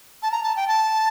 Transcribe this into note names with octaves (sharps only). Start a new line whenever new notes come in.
A5
A#5
A5
G5
A5